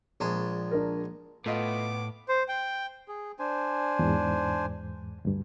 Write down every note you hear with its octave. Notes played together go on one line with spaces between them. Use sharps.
A#1 G#3 A5
D4 A#4
A2 A3 B3 F4 D#5 D6
C5
G5
G#4
D4 C5 G#5
E2 G#2
D2 G2